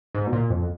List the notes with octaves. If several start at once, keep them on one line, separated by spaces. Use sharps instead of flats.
G#2
B2
A#2
F2